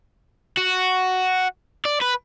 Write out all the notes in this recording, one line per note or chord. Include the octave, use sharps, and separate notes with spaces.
F#4
D5
B4